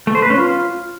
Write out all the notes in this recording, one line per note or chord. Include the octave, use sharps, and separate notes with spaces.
A3
C5
B4
C#4
F4